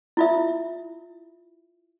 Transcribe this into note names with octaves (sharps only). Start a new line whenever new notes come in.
E4 F4 E5